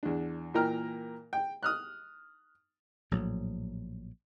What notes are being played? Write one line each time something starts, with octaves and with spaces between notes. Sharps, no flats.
E2 D4
A#2 E3 A#4 G5 A#5 F6
G5
D#6 F6 F#6
A#1 A2 F#3